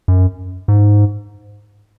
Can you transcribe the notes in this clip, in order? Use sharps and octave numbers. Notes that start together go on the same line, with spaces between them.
F#2
G#2